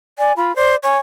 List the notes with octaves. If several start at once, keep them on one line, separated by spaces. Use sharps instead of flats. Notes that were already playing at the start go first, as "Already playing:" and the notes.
D5 G#5
F4 B5
C5 D5
C#5 G#5